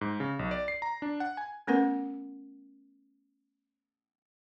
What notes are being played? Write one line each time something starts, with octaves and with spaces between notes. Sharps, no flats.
G#2
C#3
B1
D5
C7
A#5
D4
F#5
G#5
A3 B3 C#4 A#4 B4 F#5